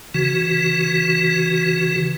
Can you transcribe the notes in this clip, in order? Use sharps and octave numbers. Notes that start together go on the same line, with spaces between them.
C#3 E3 F#4